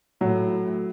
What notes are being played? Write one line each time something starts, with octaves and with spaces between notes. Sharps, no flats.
A2 F#3